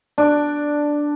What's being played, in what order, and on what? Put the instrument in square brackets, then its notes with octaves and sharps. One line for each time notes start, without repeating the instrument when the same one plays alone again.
[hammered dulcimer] D4